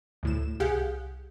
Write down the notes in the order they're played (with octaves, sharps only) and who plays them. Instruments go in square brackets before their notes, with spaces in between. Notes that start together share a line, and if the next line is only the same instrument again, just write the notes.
[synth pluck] D2 A2 E7
C2 G4 G#4 F5 F#5 G6